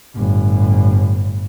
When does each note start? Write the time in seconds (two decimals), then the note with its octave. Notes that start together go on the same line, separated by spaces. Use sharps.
0.15 G1 A2